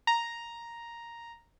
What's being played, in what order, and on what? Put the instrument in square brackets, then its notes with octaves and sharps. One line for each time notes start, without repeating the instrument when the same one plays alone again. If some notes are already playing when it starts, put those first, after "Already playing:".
[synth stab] A#5